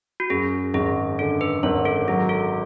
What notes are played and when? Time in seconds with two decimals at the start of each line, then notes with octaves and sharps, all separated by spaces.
0.20 F#4
0.30 F#2 G#4
0.74 G#1 G#4
1.19 D3 A4
1.41 B4
1.63 G#1 C#5
1.85 A4
2.07 F#3 G#4
2.29 A4